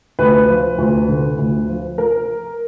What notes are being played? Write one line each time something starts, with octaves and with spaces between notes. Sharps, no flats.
D2 B4
F3
D2
D3
D2
F3
A#4